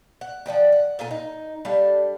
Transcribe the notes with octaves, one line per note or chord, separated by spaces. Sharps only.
F#5
F3 D5 F#5 G5
F#5
A#2 F4 A4 G#5
D#4
G3 D4 A4 F5